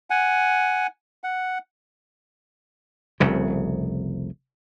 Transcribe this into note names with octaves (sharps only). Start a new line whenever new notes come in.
F#5 G#5
F#5
F1 C2 C#3